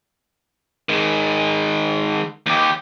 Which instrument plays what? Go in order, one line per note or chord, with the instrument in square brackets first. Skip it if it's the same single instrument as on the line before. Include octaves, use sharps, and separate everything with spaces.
[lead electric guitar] D#3 G#3
D#2 G4